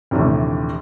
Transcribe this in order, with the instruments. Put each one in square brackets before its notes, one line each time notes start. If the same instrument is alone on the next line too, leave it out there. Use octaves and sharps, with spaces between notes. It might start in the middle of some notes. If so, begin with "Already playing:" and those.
[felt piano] A#1 D#2 C3 E3 A3